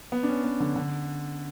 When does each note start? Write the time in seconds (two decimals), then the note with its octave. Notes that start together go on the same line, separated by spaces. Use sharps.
0.12 B3
0.23 D4
0.29 C#4
0.44 B3
0.60 D3
0.76 D3